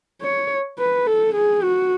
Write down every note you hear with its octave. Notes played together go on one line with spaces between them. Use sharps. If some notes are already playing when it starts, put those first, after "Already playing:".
C#5
B4
A4
G#4
F#4